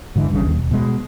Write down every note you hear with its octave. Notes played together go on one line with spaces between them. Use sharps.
G#2 D3 E3
G1 G2 A#2 C#3
D#2
E1
B2 G#3